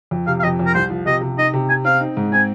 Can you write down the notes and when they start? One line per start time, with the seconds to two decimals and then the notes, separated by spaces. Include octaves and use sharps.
0.11 F2
0.27 C3 F5
0.40 F5
0.43 F2 D#5
0.59 F2
0.66 A#4
0.74 C2 C5
0.90 F3
1.06 C3 D#5
1.21 C3
1.37 D#4 D#5
1.53 C3
1.69 C3 G#5
1.84 C4 F5
2.00 D#4
2.17 G#2
2.32 C4 G#5